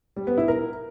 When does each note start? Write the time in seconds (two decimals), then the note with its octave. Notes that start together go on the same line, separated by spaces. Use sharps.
0.16 G3
0.27 B3
0.38 E4
0.48 A#4